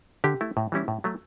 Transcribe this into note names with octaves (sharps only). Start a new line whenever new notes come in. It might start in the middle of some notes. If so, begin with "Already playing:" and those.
D3 G4
A3 E4
A2
E3 G3 C#4 E4
A2
F#3 A3